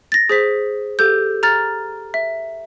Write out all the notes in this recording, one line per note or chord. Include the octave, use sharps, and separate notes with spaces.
A6 A#6
G#4 C5 B6
G4 A4 G6
A#5 F6 A6
E5